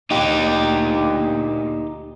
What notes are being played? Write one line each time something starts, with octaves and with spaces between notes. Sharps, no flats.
D2 A#2 D#4 G4